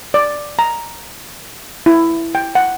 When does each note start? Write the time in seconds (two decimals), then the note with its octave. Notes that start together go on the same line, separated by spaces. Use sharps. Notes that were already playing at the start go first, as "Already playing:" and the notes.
0.14 D5
0.59 A#5
1.86 E4
2.35 G5
2.55 F#5